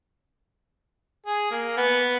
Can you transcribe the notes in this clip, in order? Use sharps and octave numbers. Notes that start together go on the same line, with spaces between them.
G#4
A#3
B3